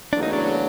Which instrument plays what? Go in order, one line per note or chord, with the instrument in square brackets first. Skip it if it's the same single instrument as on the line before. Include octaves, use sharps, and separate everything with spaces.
[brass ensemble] F#1 E2 C#3 F#3 A3 [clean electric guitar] D4
[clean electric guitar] D#4
D4